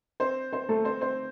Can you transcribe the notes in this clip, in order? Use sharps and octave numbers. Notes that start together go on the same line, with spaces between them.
C4 C5
C4 C5
A3 A4
C4 C5
C4 C5